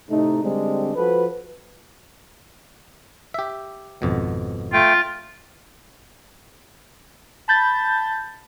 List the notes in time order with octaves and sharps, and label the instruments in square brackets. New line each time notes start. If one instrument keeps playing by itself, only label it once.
[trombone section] A2 C3 A3 D#4
D3 G3 G#3 C4 D4
F3 F#4 A4 B4
[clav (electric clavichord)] G4 E5
G#1 F2 B2
[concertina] A3 G5 [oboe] F4
[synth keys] A5 B5 G6 A6